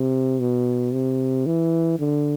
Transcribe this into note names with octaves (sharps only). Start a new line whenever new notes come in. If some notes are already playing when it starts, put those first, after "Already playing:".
Already playing: C3
B2
C3
E3
D3